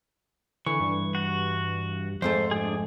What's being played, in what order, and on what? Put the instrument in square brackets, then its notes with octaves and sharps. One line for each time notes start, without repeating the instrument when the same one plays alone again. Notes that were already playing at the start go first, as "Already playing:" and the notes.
[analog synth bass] D3 [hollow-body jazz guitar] E3 [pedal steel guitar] C#6
[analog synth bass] G2
[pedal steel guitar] F#4
[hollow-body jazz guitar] F2 G#2 A3 [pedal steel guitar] C5
[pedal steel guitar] D4 G#4